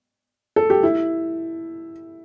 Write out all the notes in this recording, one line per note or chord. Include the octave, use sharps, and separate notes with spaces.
A4
G4
E4